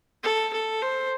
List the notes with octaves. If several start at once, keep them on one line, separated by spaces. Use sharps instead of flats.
A4
A4
C5